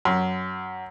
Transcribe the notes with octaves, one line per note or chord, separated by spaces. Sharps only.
F#2